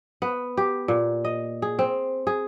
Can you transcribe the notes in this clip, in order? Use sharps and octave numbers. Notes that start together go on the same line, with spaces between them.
B3
G4
A#2
D#5
G#4
C4
G#4